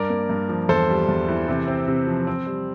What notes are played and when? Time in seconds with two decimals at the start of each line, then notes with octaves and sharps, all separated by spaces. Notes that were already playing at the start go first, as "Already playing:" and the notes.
Already playing: G2 A#4 D5
0.10 A#3
0.30 G2
0.49 F3
0.69 E2 A4 C5
0.89 G3
1.08 E2
1.28 E3
1.48 C3
1.68 C4
1.88 C3
2.07 F3
2.27 C4
2.47 G3